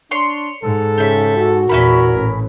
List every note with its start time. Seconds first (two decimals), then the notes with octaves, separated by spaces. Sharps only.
0.11 D4 C#5 C6
0.63 G#2 A4
0.98 C#3 G4 E5
1.37 F#4
1.69 E2 A#2 C#4 E4 A#4 B5
2.12 A1